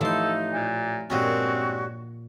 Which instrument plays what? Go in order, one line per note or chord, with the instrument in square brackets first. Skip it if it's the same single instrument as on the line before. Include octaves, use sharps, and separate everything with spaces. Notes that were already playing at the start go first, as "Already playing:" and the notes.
[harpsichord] A1 C6 [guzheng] E3 F3 [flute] D#4 [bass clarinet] A4
[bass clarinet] A#2
[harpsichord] G2 G#3 C#4 [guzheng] A#2 D#5 A5 [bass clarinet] C4 [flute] F#4